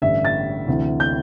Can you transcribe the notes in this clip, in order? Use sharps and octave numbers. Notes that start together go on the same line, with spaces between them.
A1 G2 D3 E5
A6
D2 C3 E3
G6